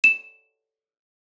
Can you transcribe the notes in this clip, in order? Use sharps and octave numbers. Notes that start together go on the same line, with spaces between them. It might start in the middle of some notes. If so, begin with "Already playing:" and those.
E7